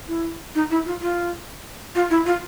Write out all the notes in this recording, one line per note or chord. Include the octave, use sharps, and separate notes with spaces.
E4
D#4
E4
F4
F4
F4
E4
F4